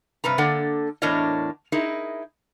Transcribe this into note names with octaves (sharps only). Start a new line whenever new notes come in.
G2 C3 B4 A#5
D3 A#3 A4 D5 F#5
E2 A2 D4 A#4 C#5 D#5
D#4 E4 G#4 A#4